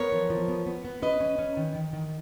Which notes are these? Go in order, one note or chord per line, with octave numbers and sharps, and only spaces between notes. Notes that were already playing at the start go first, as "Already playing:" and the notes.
Already playing: B3 A#4 C#5
F3
F3
B3
B3
B3
C#4 B4 D#5
C#4
C#4
D#3
D#3
D#3